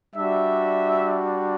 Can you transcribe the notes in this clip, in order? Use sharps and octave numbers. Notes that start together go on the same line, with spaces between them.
G3 D4 F#4 E5